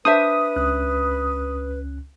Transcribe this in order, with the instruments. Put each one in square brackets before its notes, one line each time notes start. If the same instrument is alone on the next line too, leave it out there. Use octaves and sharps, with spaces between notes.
[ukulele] D4 C5 E5 [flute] B4 [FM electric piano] D#6
[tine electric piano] C#2 C#4 F#6